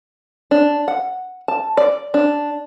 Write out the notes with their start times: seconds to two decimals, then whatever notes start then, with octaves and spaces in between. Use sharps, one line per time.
0.51 D4
0.88 F#5
1.48 A5
1.77 D5
2.14 D4